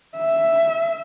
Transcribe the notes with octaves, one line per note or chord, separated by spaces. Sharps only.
E5